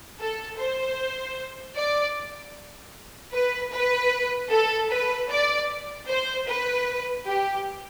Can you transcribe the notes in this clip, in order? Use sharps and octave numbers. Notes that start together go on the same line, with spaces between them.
A4
C5
D5
B4
B4
A4
B4
D5
C5
B4
G4